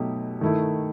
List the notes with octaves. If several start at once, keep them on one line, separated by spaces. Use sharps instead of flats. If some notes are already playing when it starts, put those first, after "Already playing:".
Already playing: B2 F#3 A3 D#4 G4
D#3 A3 E4